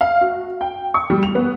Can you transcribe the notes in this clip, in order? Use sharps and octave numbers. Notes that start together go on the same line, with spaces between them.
F5
F#4
G5
C#6
G3
F7
B3